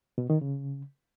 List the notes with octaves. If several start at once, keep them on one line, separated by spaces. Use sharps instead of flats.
B2
D#3
C#3